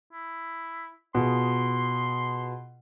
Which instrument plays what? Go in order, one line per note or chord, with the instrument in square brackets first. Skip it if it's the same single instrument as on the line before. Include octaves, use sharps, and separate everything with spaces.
[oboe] E4
[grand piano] B2 F4 G#4 [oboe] C6